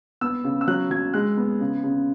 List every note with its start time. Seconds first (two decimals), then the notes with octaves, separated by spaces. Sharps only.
0.21 B3 E6
0.44 C#3
0.61 E6
0.67 F#3 F#6
0.90 F#3 G#6
1.14 G#3 F#6
1.37 B3
1.60 C#3
1.84 C#3